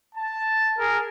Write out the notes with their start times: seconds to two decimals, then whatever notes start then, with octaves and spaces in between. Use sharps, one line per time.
0.15 A5
0.78 G#4 A#4